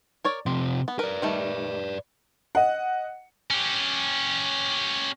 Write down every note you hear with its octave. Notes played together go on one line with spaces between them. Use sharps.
A#4 C#5 D5
C3 F3 C4
B3
A#4 B4 D5
D#3 G3 A3
D#5 F#5
C#4 G4